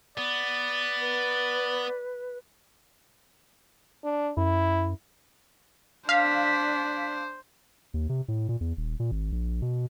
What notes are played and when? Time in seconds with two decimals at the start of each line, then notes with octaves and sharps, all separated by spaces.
0.18 B3 D5
1.00 B4
4.04 D4
4.37 F#2 E4
6.09 D4 C5 F5 B6
7.94 D#2
8.09 C3
8.28 A2
8.49 A#2
8.61 E2
8.77 D#1
9.00 A#2
9.11 G#1
9.32 A#1
9.62 B2